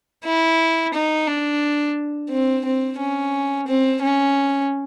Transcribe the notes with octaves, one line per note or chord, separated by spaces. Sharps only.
E4
D#4
D4
C4
C4
C#4
C4
C#4